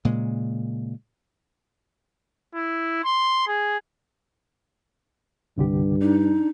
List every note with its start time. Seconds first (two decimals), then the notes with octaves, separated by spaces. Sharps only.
0.05 A#2 C#3 G#3
2.55 E4
3.04 C6
3.48 G#4
5.58 C2 G2 D3 G4
6.02 D4 D#4